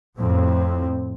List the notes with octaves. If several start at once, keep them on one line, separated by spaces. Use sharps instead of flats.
F2 A2 C4